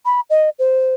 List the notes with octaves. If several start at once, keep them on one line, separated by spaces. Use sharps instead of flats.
B5
D#5
C5